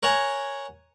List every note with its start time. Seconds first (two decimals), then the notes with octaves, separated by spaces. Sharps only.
0.03 A#4 C#5 F#5 G#5 A#5